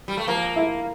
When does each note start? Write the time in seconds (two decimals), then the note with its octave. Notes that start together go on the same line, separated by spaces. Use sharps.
0.08 G3
0.17 A3
0.27 F3 A#3
0.56 E4